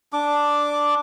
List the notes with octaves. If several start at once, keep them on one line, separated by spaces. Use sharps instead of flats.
D4 D6